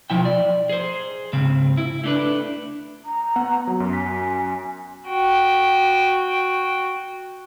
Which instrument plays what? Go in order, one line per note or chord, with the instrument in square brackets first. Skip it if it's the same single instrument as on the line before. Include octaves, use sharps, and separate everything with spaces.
[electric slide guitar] B2 F3 E4 G5
D5
G#4 C5
G#2 C#3 C4
E4
A3 D4 B4
[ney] A#5
[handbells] B3 [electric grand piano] F#5
[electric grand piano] F#3
F#2
[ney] G#5 [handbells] B6
[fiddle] F#4 G5